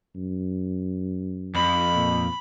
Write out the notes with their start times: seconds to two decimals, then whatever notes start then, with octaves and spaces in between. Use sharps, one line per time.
0.15 F#2
1.55 F2 B5
1.94 A#2